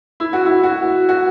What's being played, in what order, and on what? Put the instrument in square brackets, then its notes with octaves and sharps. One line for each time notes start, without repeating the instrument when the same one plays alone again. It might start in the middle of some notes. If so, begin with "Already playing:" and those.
[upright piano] E4
F#4
E4
F#4
F#4